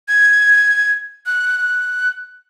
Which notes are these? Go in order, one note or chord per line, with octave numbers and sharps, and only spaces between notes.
G#6
F#6